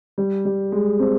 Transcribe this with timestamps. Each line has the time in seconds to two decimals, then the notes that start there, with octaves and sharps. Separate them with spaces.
0.18 G3
0.45 G3
0.72 G#3
0.99 C4